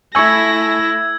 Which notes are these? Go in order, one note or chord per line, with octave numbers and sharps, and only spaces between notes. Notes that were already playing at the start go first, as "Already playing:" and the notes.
A3 E4 G#5 C#6 E6 G#6 A#6